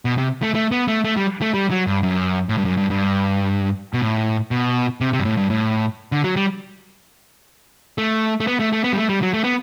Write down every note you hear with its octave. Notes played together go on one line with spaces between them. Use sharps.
B2
C3
A3
A3
B3
A3
A3
G3
A3
G3
F#3
G2
F#2
A2
G2
F#2
G2
G2
B2
A2
B2
C3
C3
G2
A2
G2
A2
D3
F#3
G3
A3
A3
B3
A3
A3
B3
G3
A3
G3
F#3
A3
B3